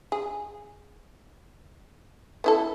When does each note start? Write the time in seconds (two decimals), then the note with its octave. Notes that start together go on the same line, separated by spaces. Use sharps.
0.12 G#4
2.44 B3 E4 A4